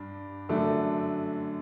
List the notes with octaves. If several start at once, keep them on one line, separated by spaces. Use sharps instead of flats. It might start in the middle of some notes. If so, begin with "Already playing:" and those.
Already playing: G2 D4
F#2 D3 A3 D4